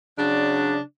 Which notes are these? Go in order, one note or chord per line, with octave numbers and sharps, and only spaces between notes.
C#3 F#3 D4